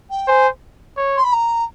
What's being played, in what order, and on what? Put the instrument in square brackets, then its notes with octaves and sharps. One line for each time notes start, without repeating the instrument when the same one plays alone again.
[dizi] G5
[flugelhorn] C5 [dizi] G#5
[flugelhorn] C#5
[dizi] C6
B5
A#5